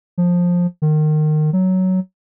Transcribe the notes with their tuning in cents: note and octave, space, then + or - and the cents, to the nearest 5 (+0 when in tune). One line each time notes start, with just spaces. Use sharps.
F3 +15
D#3 -25
F#3 +10